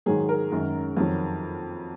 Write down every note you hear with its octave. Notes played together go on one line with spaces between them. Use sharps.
G#2 D#3 F#3 G#4
A#4
F#2 D#3 G#3
F2 D#3 F#3